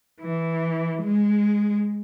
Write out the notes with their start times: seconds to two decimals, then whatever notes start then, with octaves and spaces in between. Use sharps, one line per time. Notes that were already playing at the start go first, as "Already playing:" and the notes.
0.22 E3
1.02 G#3